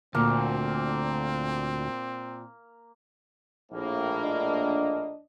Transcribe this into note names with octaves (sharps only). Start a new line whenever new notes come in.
D2 A#2 A#3 C4
A#1 A2 A#3
D4 D#5